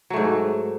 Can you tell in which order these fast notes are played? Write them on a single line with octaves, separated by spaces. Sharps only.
F#3 A3 G#2